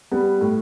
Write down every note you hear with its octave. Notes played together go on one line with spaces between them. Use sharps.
G3 B3
A2